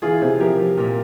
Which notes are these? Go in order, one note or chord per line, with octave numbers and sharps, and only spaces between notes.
E3 F4 G#4
C3 G#4 C5
F3 G4 A#4
F3
A#2